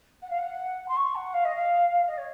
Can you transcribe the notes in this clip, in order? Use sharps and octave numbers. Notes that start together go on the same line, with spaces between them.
F#5
F5
F#5
C6
C#6
F#5
F5
D#5
F5
D#5
C#5